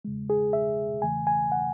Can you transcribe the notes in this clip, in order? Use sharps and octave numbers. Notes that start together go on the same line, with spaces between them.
E2 C#3 G#3
G#4
E5
E2 C#3 E3 A3 G#5
G#5
F#5